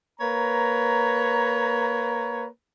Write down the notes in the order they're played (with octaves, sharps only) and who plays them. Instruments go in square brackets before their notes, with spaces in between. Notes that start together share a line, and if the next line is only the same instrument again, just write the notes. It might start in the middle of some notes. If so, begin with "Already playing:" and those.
[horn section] A#3 B4 C#5 A#5